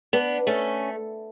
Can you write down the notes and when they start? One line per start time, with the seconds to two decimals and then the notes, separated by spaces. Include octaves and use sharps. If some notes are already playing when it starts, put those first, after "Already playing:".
0.13 B3 D4
0.47 A3 C#4